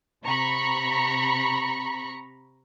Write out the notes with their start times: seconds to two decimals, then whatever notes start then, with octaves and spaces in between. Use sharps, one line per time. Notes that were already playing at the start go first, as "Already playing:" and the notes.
0.25 C3 A#5 B5 C#6 C#7